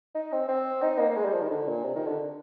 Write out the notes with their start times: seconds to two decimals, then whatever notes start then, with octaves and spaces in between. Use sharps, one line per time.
0.15 D#4
0.32 C4
0.48 C4
0.82 D#4
1.00 A#3
1.10 A#3
1.16 G#3
1.25 G3
1.33 F3
1.42 D#3
1.50 D3
1.68 A#2
1.84 C3
1.95 D#3
2.07 D3